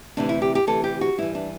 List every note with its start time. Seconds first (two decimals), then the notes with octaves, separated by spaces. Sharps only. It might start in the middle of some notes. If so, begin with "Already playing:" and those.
0.17 D2 C3 E3 D4
0.29 E4
0.42 G4
0.55 G4
0.67 D2 C3 E3 A4
0.84 G4
1.01 F#4
1.18 G2 E3 E4
1.35 D4